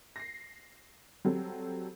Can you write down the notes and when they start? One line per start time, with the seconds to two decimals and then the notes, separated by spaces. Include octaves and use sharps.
0.16 A#6 C7
1.25 F#3 G3 C4 A4